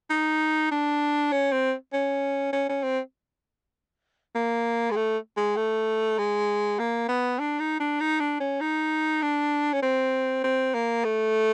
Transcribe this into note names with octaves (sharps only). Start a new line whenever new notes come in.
D#4
D4
C#4
C4
C#4
C#4
C#4
C4
A#3
G#3
A3
G#3
A3
G#3
A#3
B3
D4
D#4
D4
D#4
D4
C#4
D#4
D4
C#4
C4
C4
A#3
A3